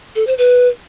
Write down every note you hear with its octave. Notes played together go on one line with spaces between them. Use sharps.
A4
C5
B4